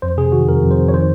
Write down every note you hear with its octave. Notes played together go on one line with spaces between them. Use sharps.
F2 C5
C3 G#4
D#3 F#4
F2 A#4
F2
C5
F2
C#5
D#3 C5